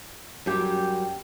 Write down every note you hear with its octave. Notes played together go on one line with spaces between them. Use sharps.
F#2 G3 G4 G5